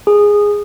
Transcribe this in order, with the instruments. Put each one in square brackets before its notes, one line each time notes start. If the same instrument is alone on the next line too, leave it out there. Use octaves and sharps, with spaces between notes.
[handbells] G#4